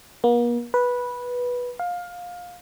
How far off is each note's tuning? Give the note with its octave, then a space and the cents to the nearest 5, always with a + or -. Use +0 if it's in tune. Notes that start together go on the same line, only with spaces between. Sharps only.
A#3 +45
B4 -10
F5 +20